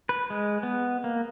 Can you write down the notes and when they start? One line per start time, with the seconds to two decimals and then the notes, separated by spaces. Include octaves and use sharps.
0.09 B4
0.30 G#3
0.63 B3
1.04 A#3